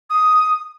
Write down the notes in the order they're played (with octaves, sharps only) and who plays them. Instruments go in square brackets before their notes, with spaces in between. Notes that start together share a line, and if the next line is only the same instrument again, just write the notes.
[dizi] D#6